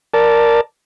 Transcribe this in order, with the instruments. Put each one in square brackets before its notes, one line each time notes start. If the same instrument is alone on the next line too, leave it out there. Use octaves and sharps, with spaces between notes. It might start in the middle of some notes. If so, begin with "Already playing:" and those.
[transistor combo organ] A#4 D5 A5